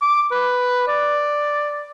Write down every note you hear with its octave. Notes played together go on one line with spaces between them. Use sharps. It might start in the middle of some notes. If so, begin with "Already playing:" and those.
D6
B4
D5